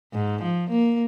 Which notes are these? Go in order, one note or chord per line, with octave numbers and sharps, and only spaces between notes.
G#2
F3
A#3